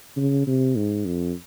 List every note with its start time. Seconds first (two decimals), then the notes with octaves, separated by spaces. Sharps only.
0.17 C#3
0.47 C3
0.77 G#2
1.06 F2